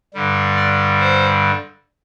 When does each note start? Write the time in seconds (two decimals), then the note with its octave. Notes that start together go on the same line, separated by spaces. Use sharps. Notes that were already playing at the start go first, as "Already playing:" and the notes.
0.14 G2 D3 G3
0.56 D5
1.00 C5